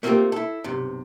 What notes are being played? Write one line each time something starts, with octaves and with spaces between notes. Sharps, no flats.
A3 A#3 C4 D4 F4 G4
E4 A4
B1 G2 C3